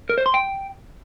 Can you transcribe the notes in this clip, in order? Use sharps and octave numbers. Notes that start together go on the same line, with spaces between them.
A#4
C5
C6
G5